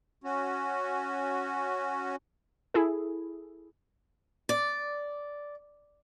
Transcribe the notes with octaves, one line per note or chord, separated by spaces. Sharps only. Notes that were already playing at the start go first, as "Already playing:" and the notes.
C#4 F#4
E4 G#4 A4
D5